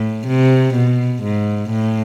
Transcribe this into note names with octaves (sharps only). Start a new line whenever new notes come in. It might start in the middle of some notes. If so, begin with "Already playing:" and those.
Already playing: A2
C3
B2
G#2
A2